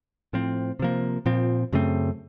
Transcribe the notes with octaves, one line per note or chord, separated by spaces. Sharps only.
A2 F3 C4
C3 F3 A#3
A#2 F3 C4
F#2 C#3 A3 C4